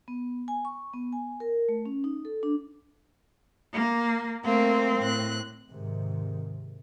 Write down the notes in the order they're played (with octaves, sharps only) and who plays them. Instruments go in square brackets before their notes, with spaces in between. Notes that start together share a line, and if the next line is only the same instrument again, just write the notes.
[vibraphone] B3
G#5
C#6
B3
G#5
A#4
A3
C#4
D#4
A4
D4
[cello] A#3
[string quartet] A3 A#3 [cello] C4
[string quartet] A2 F#6
[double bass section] G#2 C3 D#3